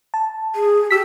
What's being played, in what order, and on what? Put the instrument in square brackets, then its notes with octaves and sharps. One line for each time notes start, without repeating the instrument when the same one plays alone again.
[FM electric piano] A5
[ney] G#4
[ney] G4 [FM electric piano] E6 B6